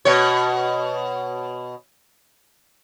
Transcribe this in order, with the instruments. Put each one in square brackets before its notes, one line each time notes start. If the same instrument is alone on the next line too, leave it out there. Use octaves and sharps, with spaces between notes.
[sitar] B2 C#5